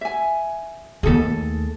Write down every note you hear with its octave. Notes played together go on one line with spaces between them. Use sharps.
E5 G#5
D#2 A3 G#4 A4